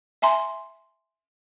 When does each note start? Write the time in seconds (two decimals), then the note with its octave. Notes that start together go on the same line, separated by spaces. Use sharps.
0.22 E5 G#5 A#5 C6